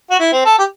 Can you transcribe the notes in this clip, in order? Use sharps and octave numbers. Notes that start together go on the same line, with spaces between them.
F#4
E4
C4
A4
G4